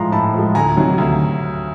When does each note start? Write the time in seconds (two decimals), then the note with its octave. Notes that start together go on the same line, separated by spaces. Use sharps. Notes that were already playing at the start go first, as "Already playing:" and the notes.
Already playing: A2 F3 G#3 A#5 C6
0.12 A2 A5 B5
0.34 F3 G#3
0.55 D2 G#5 A#5
0.77 C3 D#3 F#3
0.98 D2